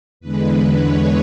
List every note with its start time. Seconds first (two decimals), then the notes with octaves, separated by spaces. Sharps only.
0.20 E2 D3 G#3 B4
0.49 B4
0.79 C#5